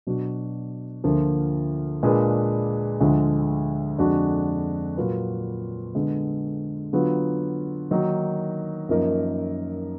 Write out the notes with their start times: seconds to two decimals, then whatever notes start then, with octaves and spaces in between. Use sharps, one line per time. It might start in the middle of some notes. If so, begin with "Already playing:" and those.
0.07 B2 F#3 D4 F#4
1.04 D2 D3 F3 A#3 F4
2.03 A#2 G#3 D4 G#4 B4
3.00 D2 D3 F3 G#3
3.98 F2 D3 G#3 D4 F#4
4.97 A#2 F#3 A#3 F4 B4
5.95 D3 G#3 B3
6.93 D3 F#3 B3 F4
7.91 D#3 F#3 A#3 D#4
8.89 F#2 F3 A#3 D#4 A#4